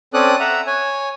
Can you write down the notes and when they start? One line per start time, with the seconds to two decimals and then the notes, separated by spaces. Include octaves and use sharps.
0.14 C4 C#4 A4 D5 D#6 F#6
0.40 E5 F#5 A#5
0.67 C#5 G#5